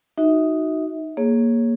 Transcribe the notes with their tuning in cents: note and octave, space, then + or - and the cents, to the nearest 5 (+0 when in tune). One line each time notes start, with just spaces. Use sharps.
D#4 +0 F#4 +0 E5 -35
A#3 +0 G#4 +0 C#5 +0